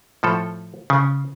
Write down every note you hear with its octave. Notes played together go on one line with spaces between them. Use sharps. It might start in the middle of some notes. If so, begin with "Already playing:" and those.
A2 F3 A4
C#3